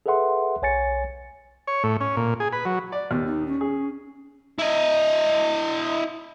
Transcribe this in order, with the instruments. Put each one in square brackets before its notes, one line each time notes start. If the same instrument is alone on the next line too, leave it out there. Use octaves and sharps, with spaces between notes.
[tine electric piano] G#4 A4 B4 E5 F#5 C6
B1 C#5 G#5 A6 C#7
[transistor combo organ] C#5
A2
C#4
A#2
G#4
B4
F#3
[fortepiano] D5
[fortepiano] D#2 [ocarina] B3
[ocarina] D#4
C#4
[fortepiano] G#4
[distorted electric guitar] E4 D#5